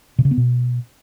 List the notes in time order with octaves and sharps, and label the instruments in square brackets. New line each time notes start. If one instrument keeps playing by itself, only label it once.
[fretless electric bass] C3
C#3
B3
B2